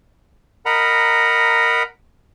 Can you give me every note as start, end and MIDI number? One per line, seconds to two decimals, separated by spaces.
0.66 1.83 70
0.66 1.83 75
0.66 1.83 78
0.66 1.83 82
0.66 1.83 83